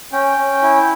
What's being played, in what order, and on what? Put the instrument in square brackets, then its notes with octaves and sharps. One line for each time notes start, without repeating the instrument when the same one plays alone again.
[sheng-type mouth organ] C#4 G5
C#4
E4